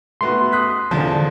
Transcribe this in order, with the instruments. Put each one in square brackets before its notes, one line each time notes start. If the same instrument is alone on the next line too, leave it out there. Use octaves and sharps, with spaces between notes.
[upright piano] A3 B3 F#4 [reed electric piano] C6
[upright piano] D#6 F#6 B6
[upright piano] E2 F3 A5 [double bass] D3